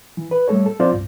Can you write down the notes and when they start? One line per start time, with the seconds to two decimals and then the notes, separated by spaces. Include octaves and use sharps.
0.17 E3
0.31 B4
0.48 G3 A3 A4 C#5
0.66 A4
0.79 F3 C4 F4 C5 D5
0.93 C2 G2